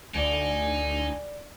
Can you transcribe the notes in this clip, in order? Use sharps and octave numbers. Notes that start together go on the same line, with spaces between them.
D2 D#4 D5 G#5 D7